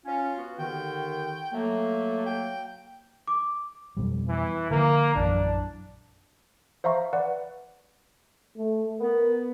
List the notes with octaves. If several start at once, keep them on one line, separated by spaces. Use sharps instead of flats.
C#4 F4
B3 F#4
D#2 D3 D#3 G5
F#3 A3 A#3
G5
D6
F2 B2 G3
E3
D3 F3 A#3
A#1 F#2 E3 D4
C5 E5 F5 A#5 C#6
B4 D5 F#5
A3
B3 A#4